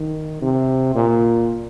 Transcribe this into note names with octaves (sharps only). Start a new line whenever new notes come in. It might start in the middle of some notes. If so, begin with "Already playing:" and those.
Already playing: D#3
C3
A#2